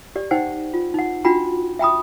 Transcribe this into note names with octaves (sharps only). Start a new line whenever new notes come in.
G4 D5
D#4 C5 F#5 G5
F4
D#4 F#5
D4 F4 F#4 G5 B5
E5 G5 B5 D#6